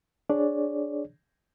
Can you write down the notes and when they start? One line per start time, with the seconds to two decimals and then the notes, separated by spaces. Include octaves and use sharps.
0.30 D4 G#4 C#5 D5